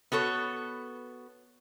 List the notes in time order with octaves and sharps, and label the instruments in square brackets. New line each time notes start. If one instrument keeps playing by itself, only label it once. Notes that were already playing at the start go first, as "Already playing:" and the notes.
[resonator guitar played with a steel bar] B3 F#4 A4 C#5